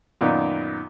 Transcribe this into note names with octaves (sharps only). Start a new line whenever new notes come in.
F#2 A#2 D#3 B3 D#4